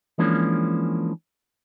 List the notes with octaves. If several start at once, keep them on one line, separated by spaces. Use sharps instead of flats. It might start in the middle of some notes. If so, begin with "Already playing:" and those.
E3 F3 G#3 A#3 C#4 D4